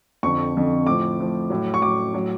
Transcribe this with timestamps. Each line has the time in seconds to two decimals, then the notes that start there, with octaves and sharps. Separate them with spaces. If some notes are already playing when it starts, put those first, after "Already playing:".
0.23 F2 D3 F3 C#6
0.55 F2 D3 F3
0.87 A2 F3 D6
1.19 A2 F3
1.50 A2 F#3
1.74 C#6
1.82 A2 F#3 D6
2.14 A2 F#3